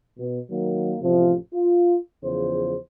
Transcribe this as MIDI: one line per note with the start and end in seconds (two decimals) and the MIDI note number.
0.19 0.39 47
0.51 0.95 51
0.51 0.95 54
0.51 0.95 58
1.01 1.34 33
1.01 1.34 48
1.01 1.34 53
1.53 1.96 65
2.23 2.76 40
2.23 2.76 49
2.23 2.76 53
2.23 2.76 72